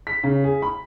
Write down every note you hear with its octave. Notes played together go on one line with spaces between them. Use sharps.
B6
C#3
G#4
B5